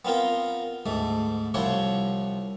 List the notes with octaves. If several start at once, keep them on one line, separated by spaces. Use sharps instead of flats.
B3 C4 F4 A#4 G5
D2 G#2 A3
C2 F3 E4 C5 C#5 F#5